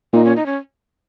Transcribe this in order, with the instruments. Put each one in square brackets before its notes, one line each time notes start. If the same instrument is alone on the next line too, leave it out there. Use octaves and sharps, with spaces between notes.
[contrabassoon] A#2 [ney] D#4
[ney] C#4
D#4
C#4